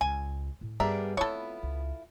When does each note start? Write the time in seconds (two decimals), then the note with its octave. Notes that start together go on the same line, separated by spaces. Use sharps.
0.01 C#2 G#5
0.61 A2
0.80 G2 G3 B3 D4 G#4 A#4 E5
1.17 A3 B3 C4 E4 F4 A4 C#5
1.63 C#2